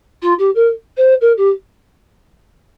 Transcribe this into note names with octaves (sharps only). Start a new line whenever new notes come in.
F4
G4
A#4
C5
A#4
G4